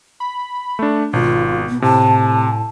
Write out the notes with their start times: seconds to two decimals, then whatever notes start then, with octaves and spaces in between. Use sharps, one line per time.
0.20 B5
0.79 A3 D4
1.13 G#1 B2 F4
1.69 B3
1.82 A2 C3 A5